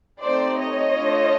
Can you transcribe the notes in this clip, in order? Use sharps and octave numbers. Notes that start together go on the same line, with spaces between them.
A3 C4 D#4 G4 C5 D5
C#5 D#5
A3 D4 F4